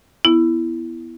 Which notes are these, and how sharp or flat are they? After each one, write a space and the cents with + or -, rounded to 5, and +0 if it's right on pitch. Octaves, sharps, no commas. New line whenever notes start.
B3 +0 E4 +5